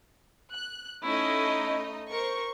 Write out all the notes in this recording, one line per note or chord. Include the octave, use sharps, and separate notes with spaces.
F#6
A3 C#4 D#4 E4 D#5
A#4 C5 C#6